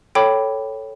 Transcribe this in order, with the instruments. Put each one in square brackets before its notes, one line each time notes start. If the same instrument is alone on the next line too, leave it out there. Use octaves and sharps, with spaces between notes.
[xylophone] A4 C#5 G5 B5 D6